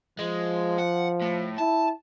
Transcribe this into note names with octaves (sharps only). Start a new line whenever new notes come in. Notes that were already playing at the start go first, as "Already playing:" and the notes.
F3 G#3
F#5
A2
E4 A5